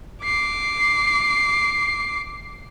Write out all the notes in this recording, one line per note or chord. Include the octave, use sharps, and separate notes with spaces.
D6 C7